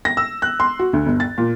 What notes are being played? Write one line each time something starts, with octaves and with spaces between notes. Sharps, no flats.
A#6
E6
F#6
C6
F#4
D2
G1
A6
A#2